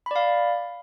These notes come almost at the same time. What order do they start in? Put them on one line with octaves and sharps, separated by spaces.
B5 D5 F5